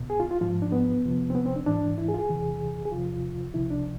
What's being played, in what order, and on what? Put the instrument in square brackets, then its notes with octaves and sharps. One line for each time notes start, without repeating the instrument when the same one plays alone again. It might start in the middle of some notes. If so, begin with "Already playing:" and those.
Already playing: [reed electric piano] C2 B2
G#4
F4
F4
G#2 F3 F4
D4
B3
F2 C3 F3
C4
B3
C4
D4
G#2 E3 D4
E4
G#4
F4
G#4
E2 C3 E3
G#4
E2 C3 F3 F4
C2 C3 F3 E4
D4